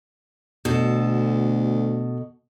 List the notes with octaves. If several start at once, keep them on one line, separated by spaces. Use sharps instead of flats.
D2 B2 A4